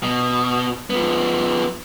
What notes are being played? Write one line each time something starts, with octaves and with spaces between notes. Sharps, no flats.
B2
F3 B3